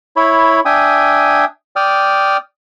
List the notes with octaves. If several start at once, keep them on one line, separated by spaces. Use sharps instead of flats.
E4 C#5 B5
D4 E5 G5 G#5 D#6
D5 G5 D#6 F6